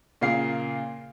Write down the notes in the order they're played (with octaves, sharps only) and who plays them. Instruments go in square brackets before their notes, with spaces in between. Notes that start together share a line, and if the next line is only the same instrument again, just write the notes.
[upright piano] A#2 C#3 A#3 F5 C7